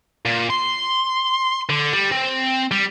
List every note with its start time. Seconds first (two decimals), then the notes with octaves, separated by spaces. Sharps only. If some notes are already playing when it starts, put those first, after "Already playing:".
0.25 A#2
0.50 C6
1.69 D3
1.93 G3
2.11 C4
2.71 G3